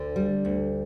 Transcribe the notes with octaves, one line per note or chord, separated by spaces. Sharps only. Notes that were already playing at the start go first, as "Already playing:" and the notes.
Already playing: D2 D3
G3
D2